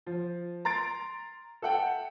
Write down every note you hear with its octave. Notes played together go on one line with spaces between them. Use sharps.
F3
A#5 C6 A6 D7
A4 E5 F#5 G5